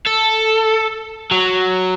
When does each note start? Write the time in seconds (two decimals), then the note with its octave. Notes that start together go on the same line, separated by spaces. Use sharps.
0.06 A4
1.31 F#3